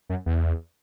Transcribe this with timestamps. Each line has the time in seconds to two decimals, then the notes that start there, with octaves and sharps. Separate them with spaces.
0.09 F#2
0.26 E2